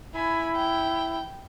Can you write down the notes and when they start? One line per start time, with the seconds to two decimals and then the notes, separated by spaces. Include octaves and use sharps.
0.15 E4 G#5 B5
0.56 G5